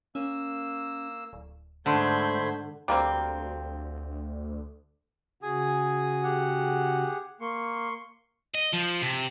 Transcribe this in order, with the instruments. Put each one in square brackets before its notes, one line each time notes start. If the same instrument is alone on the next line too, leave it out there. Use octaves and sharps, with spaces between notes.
[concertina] A#3 E6 [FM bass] C#4
[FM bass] D1
[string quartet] G#2 G6 G#6 [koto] D3 [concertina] A3 C5 B5
[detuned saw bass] D2 [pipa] G3 A#3 C4
[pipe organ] C#3 F#4 [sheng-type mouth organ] G#4 G#5 D#6
[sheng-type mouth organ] G4 G#4 F#5
[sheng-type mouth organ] A#3 [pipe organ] C6 C#6
[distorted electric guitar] D#5
F3
C3